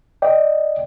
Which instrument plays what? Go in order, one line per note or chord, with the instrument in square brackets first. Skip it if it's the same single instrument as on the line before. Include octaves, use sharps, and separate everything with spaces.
[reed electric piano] D5 D#5 G5